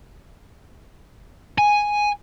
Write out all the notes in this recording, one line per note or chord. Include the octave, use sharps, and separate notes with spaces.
G#5